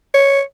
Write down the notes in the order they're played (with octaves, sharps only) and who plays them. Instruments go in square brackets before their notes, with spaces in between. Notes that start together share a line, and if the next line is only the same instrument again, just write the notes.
[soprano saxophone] C#5